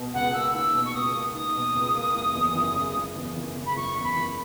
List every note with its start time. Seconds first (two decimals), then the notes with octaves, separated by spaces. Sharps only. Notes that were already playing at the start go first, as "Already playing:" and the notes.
Already playing: B2
0.14 C#2 F#5
0.34 A#3 E6
0.54 D#4 E6
0.74 B2
0.86 C#6
0.94 C#2 D#6
1.14 A#3
1.34 D#4 D#6
1.55 B2
1.75 C#2
1.95 A#3
2.15 F#1
2.35 E2
2.56 F#1
2.76 C#3
2.95 F#1
3.16 E2
3.36 F#1
3.56 C#3
3.66 B5
3.76 F#1 C#6
3.97 E2
4.03 B5
4.17 F#1